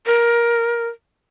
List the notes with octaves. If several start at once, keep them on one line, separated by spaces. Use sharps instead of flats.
A#4